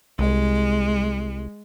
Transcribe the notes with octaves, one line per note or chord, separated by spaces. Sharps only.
C2 G#3